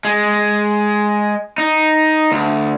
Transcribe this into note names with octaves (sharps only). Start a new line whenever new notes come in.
G#3
D#4
D2